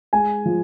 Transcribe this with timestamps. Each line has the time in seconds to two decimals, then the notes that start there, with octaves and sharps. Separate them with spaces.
0.13 G#3 G#5
0.45 F3